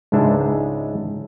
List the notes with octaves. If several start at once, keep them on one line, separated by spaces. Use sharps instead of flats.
C#2 G#2 G#3 D4 E5